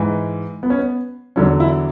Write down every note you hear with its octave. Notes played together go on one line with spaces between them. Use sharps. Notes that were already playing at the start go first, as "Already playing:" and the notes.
Already playing: G#2 E3
B3
C#4
B3
E2 D3 F#3 C#4
E4